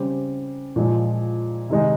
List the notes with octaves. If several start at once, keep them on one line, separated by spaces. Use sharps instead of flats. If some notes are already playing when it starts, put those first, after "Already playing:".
Already playing: C#3 G3 C4 G4
A#2 F3 G#3
C3 D#3 G#3 D#4